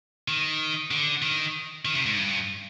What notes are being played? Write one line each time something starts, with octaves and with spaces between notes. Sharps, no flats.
D#3
D3
D#3
D#3
C3
G#2
G2